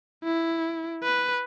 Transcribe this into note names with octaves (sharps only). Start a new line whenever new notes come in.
E4
B4